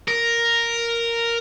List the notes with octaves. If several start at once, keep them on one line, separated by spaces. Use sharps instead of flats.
A#4